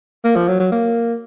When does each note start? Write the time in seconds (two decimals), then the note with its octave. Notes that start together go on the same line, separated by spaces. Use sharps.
0.25 A#3
0.36 F3
0.48 F#3
0.60 F#3
0.72 A#3